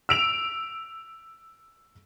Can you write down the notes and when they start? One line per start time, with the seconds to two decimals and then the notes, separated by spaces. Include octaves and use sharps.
0.09 E6 D7 F7